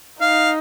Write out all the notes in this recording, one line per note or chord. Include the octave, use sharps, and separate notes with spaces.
D#4 F5